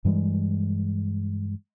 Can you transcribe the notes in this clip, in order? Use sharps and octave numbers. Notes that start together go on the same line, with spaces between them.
G2 E3 G3 G#3